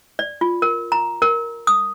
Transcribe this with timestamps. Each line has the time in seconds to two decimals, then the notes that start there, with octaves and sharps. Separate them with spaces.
0.19 D5
0.41 F4
0.62 A#4
0.92 A#5
1.22 A#4
1.67 D#6